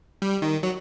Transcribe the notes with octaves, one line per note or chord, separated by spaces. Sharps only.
G3
D#3
F#3